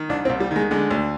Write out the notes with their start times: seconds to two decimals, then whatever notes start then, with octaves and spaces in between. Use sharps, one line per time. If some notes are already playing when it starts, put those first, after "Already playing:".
Already playing: D#3
0.09 C2 D4
0.25 C4
0.29 C2
0.40 G3
0.51 D#3 G#3
0.71 D3 G#3
0.91 D2